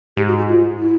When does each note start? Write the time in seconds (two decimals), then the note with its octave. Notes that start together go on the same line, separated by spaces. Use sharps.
0.17 G#2 G4
0.28 F#4
0.38 F#4
0.49 F4
0.79 E4